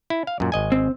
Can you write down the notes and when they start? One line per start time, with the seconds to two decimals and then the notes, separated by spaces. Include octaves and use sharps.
0.10 E4
0.27 F5
0.40 F#2 A#2
0.52 G#1 D#5 G#5
0.72 C4